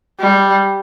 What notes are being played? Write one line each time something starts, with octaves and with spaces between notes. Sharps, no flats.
G3